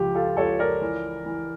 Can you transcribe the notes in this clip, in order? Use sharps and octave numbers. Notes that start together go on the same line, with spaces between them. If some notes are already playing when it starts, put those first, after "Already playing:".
Already playing: C#2 C#3 F3 G4
F4 A4
C#2 A4 C#5
A#4 D5
E3
E3